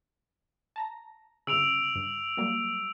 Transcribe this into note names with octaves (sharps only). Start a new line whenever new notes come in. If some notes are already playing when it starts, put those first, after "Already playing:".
A5 A#5 A#6
G1 C#3 E6 D7 F7
G2
F#3 G3 A#3